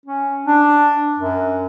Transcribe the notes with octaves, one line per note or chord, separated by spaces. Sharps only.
C#4
D4
F#2